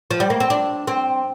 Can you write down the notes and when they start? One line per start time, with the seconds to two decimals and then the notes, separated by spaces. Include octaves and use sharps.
0.11 F3
0.20 G3
0.30 A#3
0.40 C4
0.50 D4
0.87 C4